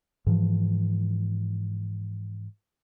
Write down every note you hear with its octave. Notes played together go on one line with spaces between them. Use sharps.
G#2 E3 F3